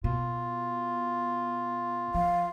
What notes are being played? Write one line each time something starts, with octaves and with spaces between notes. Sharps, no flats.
B2 F4
F3 F5